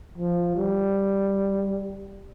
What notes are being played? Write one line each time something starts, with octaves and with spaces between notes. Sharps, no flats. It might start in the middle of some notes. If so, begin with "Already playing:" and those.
F3
G3